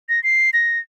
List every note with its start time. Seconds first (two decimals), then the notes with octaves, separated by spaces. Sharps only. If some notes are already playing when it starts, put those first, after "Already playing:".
0.09 A#6
0.23 C7
0.53 A#6